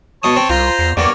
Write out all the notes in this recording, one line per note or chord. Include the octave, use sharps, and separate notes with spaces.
B2 C#5 A5 D#6
C4
C2 F4 C5 A#5
E2
E2 G2 A#3 B3 C#5 D6